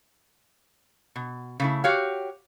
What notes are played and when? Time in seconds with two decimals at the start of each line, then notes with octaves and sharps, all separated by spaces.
1.16 B2
1.60 C#3 A3 E4
1.84 F#4 G4 C#5 F5